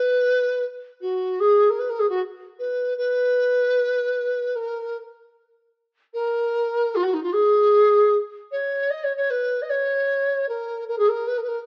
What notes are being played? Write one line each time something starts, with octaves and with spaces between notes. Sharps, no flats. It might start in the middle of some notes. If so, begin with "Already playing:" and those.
Already playing: B4
F#4
G#4
A#4
B4
A#4
G#4
F#4
B4
B4
A#4
A#4
F4
F#4
D#4
F4
G#4
C#5
D#5
C#5
C#5
B4
D#5
C#5
A#4
A#4
G#4
A#4
B4
A#4
B4
A#4